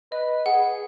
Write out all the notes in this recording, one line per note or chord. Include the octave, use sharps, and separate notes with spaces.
B4 D#5
G#4 F#5